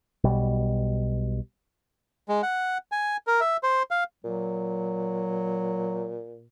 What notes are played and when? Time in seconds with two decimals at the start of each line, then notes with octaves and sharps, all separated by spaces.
0.24 B1 B2 G3
2.29 G#3
2.43 F#5
2.92 G#5
3.27 A#4
3.40 E5
3.63 C5
3.91 F5
4.24 A#2 F#3